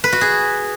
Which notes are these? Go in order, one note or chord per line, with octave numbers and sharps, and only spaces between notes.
B4
F#4
G#4